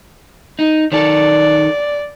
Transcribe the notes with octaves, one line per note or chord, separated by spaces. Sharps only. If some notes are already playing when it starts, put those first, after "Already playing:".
D#4
D#3 A4 D5